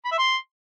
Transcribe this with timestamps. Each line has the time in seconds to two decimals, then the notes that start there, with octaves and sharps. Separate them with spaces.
0.05 B5
0.12 E5
0.18 C6